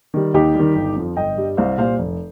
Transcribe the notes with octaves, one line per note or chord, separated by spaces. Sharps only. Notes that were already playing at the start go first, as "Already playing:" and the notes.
D#3 G3
D#2 D#4 G4
D#3 G3
G1
F2 F3
G1 D#5 G5
G2 G3
C2 C5 F5
A#2 G3 C5 F5
F1